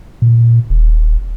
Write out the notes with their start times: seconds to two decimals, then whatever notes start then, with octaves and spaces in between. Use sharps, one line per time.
0.22 A#2
0.70 D#1